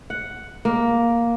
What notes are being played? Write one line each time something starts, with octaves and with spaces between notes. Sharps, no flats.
F#5
A#3